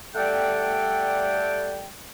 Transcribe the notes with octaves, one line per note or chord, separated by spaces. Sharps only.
G3 A3 A4 D5 F#5 G5